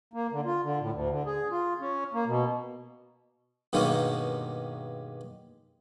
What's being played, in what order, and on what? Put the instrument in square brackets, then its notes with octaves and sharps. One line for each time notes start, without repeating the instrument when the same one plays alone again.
[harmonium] A#3
D3
F4
D3
A2
D2
D3
G#4
F4
C#4
A#3
B2
[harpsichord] G2 B2 D#3 G#3 A#3 C#4